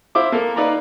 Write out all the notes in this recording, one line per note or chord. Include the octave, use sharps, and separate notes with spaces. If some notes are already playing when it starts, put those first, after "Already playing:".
E4 C5 F5 D6
A#3 A4 A#4
D#4 B4 D5 F5 A#5